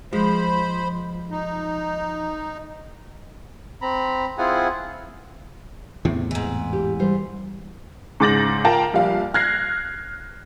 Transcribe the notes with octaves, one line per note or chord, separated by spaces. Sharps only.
F3 G#3 C5 B5
D#4
C4 A#5 B5
C4 E4 F4 G#4 F#5 G#5
E2 A2 C3
G#2 E3
G4
G3 C5
G#2 C#3 D6 A6 A#6 F#7
F4 A#4 F5 G5 A5 A#5
A#1 G3 F5
F6 F#6 G#6 A#6 C7